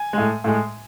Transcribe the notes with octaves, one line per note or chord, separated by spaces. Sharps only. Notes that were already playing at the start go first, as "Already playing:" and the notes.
Already playing: G#5
A2 G#3
A2 G#3